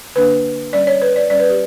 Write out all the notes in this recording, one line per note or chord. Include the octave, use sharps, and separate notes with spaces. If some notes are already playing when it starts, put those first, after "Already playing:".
D3 A#3 D4 B4
G3 C#4 D5
C#5
B4
D5
G3 C#4 D5
B4
G4